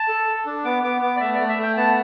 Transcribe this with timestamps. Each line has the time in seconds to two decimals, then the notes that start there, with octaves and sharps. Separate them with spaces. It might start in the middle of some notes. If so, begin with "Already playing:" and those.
Already playing: A5
0.08 A4
0.27 A4
0.46 D4
0.65 B3 D6
0.84 B3 D6
1.02 B3 D6
1.16 D5
1.20 A3 E5
1.35 A3 D5
1.49 E5
1.58 A3 G5
1.77 B3 A5